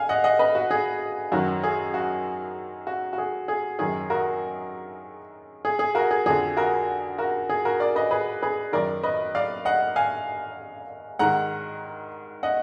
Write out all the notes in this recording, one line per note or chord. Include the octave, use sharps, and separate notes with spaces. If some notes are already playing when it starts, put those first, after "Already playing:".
Already playing: F5 G#5
D#5 F#5
D#5 F#5
B4 D#5
F#4
G#4
F#2 D#3 F#4
G#4
F#4
F#4
F#4
G#4
G#4
F#2 D#3 G#4
F#4 A#4
G#4
G#4
F#4 A#4
G#4
F2 D3 G#4
F#4 A#4
F#4 A#4
G#4
F#4 A#4
A#4 D5
B4 D#5
G#4 B4
G#4 B4
F#2 D#3 A#4 D5
B4 D#5
D5 F5
D#5 F#5
F5 G#5
G#2 D#3 F#5 A#5
D#5 F#5